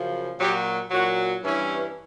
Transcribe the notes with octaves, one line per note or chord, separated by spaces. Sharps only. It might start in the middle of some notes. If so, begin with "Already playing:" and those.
Already playing: F#2 C#3 F3
A#2 F#3 G4
A#2 F#3 F#4
G2 E3 C#4